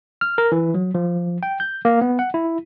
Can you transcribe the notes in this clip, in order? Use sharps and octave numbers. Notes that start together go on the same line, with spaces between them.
F6
A#4
E3
F#3
F3
G5
G6
A#3
B3
F#5
E4